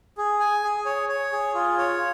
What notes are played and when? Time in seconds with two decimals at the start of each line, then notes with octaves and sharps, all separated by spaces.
0.18 G#4
0.40 G#5
0.63 G#4
0.86 C#5
1.09 C#5
1.33 G#4
1.54 F4
1.78 C#5